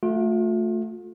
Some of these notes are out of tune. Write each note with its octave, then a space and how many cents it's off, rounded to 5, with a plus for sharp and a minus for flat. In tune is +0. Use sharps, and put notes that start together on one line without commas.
A3 +0 F4 +40